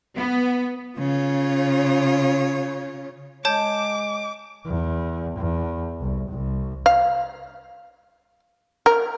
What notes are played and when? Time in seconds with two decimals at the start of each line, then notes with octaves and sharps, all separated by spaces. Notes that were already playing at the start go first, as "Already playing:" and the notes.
0.15 B3
0.98 C#3 F4 C#5
3.45 G#3 C#5 A5 D6 G6
4.66 E2
5.38 E2
6.01 C2
6.30 C2
6.86 F5
8.86 A#4